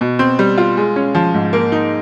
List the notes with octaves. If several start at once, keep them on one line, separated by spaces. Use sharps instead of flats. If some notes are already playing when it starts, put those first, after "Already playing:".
B2
C4
G3
F4
G#3
C#4
F3
G#2
A#3
D#4